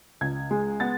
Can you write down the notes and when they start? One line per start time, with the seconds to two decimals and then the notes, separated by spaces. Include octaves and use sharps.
0.21 C#2 G#6
0.51 G#3
0.80 B3 A6